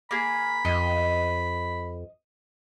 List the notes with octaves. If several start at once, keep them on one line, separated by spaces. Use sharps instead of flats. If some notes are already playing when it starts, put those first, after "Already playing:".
A#3 G#4 B5
F2 D#5